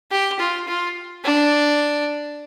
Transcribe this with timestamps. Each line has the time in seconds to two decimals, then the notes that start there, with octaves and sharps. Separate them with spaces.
0.11 G4
0.39 F4
0.68 F4
1.24 D4